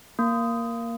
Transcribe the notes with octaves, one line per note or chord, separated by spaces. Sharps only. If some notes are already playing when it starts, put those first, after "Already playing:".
A#3